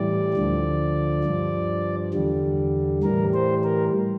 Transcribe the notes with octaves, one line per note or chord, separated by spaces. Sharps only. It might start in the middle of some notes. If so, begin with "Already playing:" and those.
Already playing: A2 E3 G3 D5
D2 D3 F3
G2 F3
E2 D3 G3
A2 E3 G3 A#4
C5
A#4